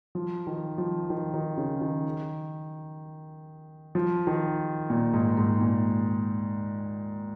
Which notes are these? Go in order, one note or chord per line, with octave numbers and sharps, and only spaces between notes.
F3
D#3
F3
D#3
D#3
C#3
D#3
F3
D#3
A#2
G#2
G#2
A#2